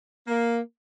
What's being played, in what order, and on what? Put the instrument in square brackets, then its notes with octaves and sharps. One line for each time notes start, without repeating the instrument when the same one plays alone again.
[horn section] A#3